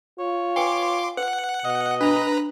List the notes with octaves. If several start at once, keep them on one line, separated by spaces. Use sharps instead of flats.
F4 C#5
B4 G5 G#5 C6 D6
B4 F#5
B2 D#5
D4 B4 A#5